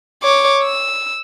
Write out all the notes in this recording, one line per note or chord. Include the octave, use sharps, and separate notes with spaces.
C#5 D6
E6